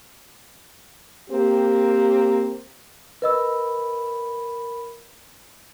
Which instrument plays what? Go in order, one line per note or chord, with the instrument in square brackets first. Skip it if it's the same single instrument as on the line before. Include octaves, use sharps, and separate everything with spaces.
[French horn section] A#3 C4 G4
[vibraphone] A#4 B5 [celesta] B4 D#5 E6